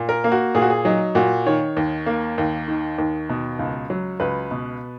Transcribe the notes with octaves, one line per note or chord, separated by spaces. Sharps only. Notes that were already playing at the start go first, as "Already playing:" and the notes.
Already playing: A#2
A#4
A#3
F#4
A#2 G#4
F#4
G#4
F#3 D#4
A#2 F#4
D#3 C#5
D#2
A#3
D#2
D#3
D#2
B2
C#2
F#3
C#2 B4
B2